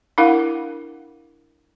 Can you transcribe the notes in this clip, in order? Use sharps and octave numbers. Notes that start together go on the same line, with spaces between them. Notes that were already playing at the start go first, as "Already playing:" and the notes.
D4 E4 A#4 F5 F#5